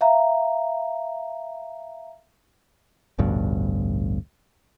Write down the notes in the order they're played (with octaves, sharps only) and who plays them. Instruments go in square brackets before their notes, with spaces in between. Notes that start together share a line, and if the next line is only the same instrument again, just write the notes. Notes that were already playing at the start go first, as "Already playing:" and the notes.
[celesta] E5 F5 A#5
[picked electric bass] A1 D2 G2 B2